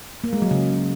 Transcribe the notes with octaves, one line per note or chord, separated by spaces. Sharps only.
A#3
G#3
F#3
C#3